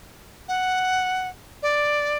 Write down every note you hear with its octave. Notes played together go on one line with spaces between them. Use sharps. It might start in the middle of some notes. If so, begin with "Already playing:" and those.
F#5
D5